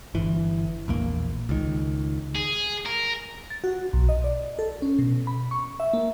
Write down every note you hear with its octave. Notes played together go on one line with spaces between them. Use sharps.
G1 E3
A#1 E2 A#3
C#2 D#3
G#4
A#4
A6
F#4
B1
D#5
D5
A4
C#4
B2
B5
C#6
E5
A#3